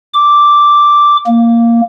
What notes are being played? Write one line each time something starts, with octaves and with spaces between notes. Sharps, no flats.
D6
A#3